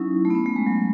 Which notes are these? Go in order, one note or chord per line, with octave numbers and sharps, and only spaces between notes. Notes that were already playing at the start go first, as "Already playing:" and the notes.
Already playing: F#3 C#4 D#4 E4
A3
B3
C#4
A3
G#3
F#3